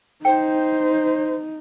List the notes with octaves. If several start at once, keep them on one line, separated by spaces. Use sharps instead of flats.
D#4 C5 G5